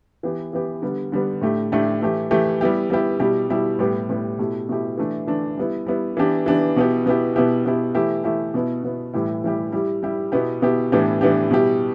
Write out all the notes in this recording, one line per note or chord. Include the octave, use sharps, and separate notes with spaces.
E3 B3 G4
E3 B3 G4
D3 G3 B3
D3 G3 B3
A2 A3 D4 G4
A2 A3 D4 G4
E3 A3 G4
E3 A3 G4
G3 B3 E4 G4
G3 B3 E4 G4
B2 G3 E4 G4
B2 G3 E4 G4
A2 G3 B3 G4
A2 G3 B3 G4
B2 A3 E4 G4
B2 A3 E4 G4
E3 A3 D4
E3 A3 D4
G3 B3 E4
G3 B3 E4
E3 B3 D4 G4
E3 B3 D4 G4
B2 B3 E4 G4
B2 B3 E4 G4
B2 B3 E4 G4
B2 B3 E4 G4
E3 A3 E4 G4
E3 A3 E4 G4
B2 B3 E4
B2 B3 E4
A2 E3 G3 E4 G4
A2 E3 G3 E4 G4
G3 E4 G4
G3 E4 G4
B2 B3 E4 G4
B2 B3 E4 G4
A2 E3 B3 D4 G4
A2 E3 B3 D4 G4
B2 G3 E4 G4